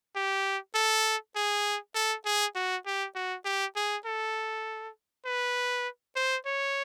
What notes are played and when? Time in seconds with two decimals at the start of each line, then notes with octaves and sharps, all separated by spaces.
0.16 G4
0.75 A4
1.36 G#4
1.95 A4
2.25 G#4
2.55 F#4
2.86 G4
3.15 F#4
3.45 G4
3.76 G#4
4.05 A4
5.25 B4
6.16 C5
6.46 C#5